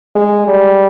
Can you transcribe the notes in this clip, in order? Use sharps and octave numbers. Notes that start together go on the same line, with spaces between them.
G#3
G3